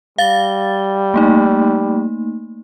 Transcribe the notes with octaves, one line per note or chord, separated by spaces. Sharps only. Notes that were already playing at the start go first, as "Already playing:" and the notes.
G3 F5 A6 G7
A3 A#3 D#4